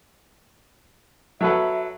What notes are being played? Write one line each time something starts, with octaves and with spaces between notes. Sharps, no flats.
F#3 A4 B4 E5